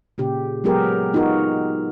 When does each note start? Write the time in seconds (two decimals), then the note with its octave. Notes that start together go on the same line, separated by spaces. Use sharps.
0.18 A#2 C#3 G4
0.64 F#3 G#3 B3 G4 G#4 A#4
1.13 B3 D#4 F4 F#4 A#4